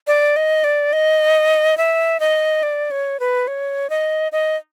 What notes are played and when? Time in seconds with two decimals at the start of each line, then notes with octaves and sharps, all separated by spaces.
0.07 D5
0.36 D#5
0.64 D5
0.93 D#5
1.77 E5
2.20 D#5
2.63 D5
2.91 C#5
3.20 B4
3.48 C#5
3.90 D#5
4.32 D#5